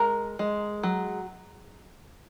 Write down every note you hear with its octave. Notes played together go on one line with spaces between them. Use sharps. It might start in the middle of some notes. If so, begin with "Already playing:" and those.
Already playing: G#3 A#4 A#5
G#3
F#3